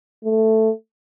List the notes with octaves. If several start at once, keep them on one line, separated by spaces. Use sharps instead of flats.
A3